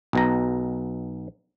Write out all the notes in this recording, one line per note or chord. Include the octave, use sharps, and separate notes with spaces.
B1 B2 A#5